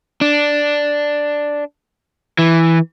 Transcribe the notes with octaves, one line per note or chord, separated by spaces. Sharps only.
D4
E3